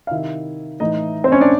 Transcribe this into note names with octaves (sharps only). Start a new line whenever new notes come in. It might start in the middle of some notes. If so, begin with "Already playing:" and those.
F5
C3 D#3 E4 E5
A2 E3 D#4 D#5
C4 C5
C#4 C#5
D4 D5